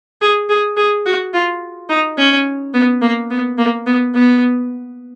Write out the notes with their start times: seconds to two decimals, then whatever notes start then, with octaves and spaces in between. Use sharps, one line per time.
0.21 G#4
0.49 G#4
0.77 G#4
1.06 F#4
1.33 F4
1.89 D#4
2.18 C#4
2.74 B3
3.01 A#3
3.30 B3
3.58 A#3
3.86 B3
4.14 B3